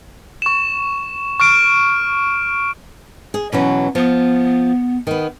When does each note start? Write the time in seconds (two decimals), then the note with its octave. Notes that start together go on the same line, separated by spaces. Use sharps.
0.42 C#6 E7
1.40 C#6 F6 D7
3.34 G#4
3.53 B2 E3 F#3 C#4
3.95 F3 B3
5.07 D#3 B3